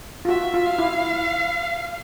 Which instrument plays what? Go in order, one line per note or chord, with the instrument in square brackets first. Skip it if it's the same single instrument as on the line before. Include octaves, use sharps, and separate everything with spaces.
[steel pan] F4
[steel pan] F#4 [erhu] E5
[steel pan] F4
[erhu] F5
[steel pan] E4